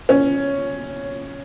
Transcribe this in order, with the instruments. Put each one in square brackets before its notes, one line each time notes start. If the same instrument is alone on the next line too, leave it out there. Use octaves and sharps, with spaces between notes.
[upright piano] C#4